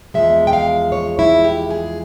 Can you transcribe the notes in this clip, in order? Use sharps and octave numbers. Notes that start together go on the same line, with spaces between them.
E2 C#3 F3 G#3 E5
G5
F5
C#5
E4
G4
G#4